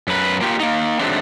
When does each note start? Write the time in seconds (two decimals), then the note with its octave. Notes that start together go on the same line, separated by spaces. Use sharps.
0.07 F#2 B4
0.41 A#3 F4 G4
0.60 A#3 D#4
1.00 D#3 F#3 G#3 A3 C4 D4